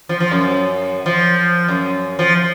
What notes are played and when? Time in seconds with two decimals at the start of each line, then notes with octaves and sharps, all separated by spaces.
0.09 F3
0.20 F3
0.31 F#2
1.06 F3
1.68 F#2
2.19 F3